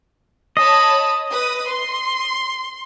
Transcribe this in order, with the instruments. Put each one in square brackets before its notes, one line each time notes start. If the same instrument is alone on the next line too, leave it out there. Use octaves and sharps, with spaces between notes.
[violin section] C#5 A5 B5 [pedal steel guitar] D#5
[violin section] B4 D#6
C6